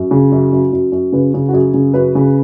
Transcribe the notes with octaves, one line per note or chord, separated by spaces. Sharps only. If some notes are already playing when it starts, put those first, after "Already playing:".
Already playing: F#2
C#3
F#2
F#2
F#2
F#2
C#3 B4
C#3
F#4
F#2 G#4
C#3
F#2 B4
C#3